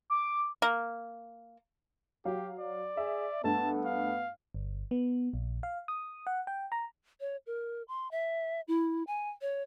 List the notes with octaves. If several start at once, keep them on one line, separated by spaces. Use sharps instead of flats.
D6
A#3
F#3 G4 F5
D5
G#4 E5
G2 A3 B3 A5
F5
G1
B3
A#1
F5
D#6
F#5
G5
A#5
C#5
A#4
C6
E5
E4
G#5
C#5